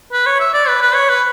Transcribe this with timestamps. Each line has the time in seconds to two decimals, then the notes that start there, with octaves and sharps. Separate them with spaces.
0.13 B4
0.27 C#5
0.40 E5
0.54 D5
0.68 B4
0.81 B4
0.95 C#5
1.09 B4